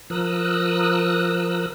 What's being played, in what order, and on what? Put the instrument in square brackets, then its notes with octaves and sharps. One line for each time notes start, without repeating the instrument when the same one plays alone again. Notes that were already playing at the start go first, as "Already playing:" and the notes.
[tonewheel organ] F3 A#4 D#6 E6 F#6